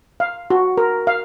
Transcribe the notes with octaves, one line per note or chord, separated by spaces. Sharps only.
F5
F#4
A#4
F5